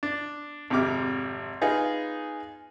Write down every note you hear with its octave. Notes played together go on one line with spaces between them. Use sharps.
D4
G#1 F2 C3 D6 F6
B3 D#4 F4 G#4